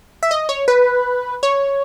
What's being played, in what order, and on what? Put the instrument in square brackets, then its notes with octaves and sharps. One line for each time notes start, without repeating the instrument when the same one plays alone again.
[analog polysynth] E5
D#5
C#5
B4
C#5